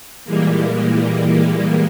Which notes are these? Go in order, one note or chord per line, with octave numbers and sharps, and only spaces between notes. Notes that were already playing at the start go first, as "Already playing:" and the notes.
A#2 E3 G3 G#3 A#3